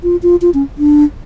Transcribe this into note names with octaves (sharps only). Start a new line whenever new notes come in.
F4
F4
F4
C#4
D4